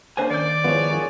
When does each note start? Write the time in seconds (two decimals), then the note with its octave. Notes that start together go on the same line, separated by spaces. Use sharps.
0.17 A#3 C#4 D4 B4 C5 G#5
0.30 D#3 D5 G6 C7
0.64 F3 G#3 B3 E4 C#5
0.89 F3 G#4 A#4